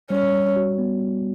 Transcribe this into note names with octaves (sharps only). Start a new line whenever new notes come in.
G3 C#4
G3
F#4
B3
G3